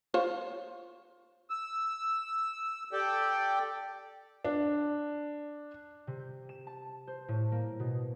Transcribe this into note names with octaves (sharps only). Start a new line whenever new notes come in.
F4 C5 C#5
E6
G4 A4 D5 G5
D4
C3
G6
E7
A5
C5
A2
A#3
B2